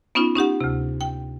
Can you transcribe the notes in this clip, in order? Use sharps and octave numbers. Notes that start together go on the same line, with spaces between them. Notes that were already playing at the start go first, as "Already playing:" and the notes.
B3 C#4 D#4 F4
C#4 D#4 G4 F#5
D2 C3
G5